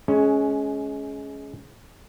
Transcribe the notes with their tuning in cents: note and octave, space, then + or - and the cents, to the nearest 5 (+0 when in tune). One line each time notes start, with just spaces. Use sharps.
G#3 +20 C#4 +0